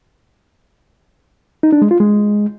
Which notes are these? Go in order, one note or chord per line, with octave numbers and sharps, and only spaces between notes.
D#4
D4
G#3
F4
G#3